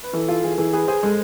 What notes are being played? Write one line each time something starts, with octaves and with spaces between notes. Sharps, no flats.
B4
E3 A4
F4 A4
E3 G#4
E3 G#4
G#4 B4
G#4 C5
G#3 A4